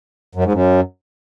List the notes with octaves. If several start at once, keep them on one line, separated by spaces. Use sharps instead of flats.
F#2
G#2
F#2